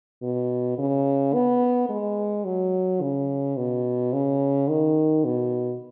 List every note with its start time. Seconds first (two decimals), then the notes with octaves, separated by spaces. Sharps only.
0.23 B2
0.78 C#3
1.34 B3
1.89 G#3
2.45 F#3
3.01 C#3
3.57 B2
4.13 C#3
4.69 D#3
5.25 B2